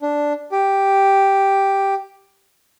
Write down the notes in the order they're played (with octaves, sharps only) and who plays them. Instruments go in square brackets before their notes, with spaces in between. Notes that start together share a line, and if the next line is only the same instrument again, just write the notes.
[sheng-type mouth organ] D4
G4